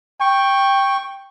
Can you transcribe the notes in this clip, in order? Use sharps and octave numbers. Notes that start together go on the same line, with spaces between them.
G5 C#6